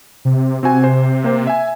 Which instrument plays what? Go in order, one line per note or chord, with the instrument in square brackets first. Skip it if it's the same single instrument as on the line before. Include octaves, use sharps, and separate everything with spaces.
[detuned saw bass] C3
[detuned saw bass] C3 [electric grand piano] C4 F#4 G#5
[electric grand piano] C5
A#3 C5
E5 G#5